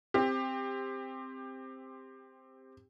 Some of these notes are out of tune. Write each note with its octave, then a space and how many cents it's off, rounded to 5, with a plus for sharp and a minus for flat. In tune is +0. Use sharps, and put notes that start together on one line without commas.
C4 +0 G4 +20